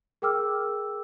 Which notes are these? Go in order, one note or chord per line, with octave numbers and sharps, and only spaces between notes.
G#4 A#4 G5 D6 E6 F6